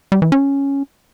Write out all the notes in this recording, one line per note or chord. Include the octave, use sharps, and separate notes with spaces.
G3
E3
C#4